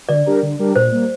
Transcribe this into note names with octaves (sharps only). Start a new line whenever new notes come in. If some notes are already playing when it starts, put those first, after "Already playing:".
D3 D5
G3 D4 G4 A#4
D3
G3 D4 G4 A#4
A#2 C5
G3 A#3